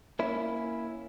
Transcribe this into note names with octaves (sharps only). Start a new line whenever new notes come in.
A#3 C#4 E4